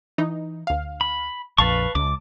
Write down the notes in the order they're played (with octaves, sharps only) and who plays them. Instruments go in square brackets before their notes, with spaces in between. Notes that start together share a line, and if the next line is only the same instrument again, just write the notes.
[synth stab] E3 D#4
D2 F5
[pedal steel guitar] B5
[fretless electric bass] A#1 F2 [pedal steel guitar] B4 F5 C#6 [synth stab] A5
[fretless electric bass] C#2 [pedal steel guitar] D6